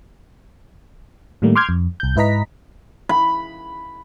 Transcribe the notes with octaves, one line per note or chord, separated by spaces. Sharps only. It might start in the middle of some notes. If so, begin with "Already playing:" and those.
A2 D#3 G3 A3 A#3
C6 D6 F6 G6 G#6
F2
C2 G6
G#2 E4 B4 D#5 A#5 B6
B5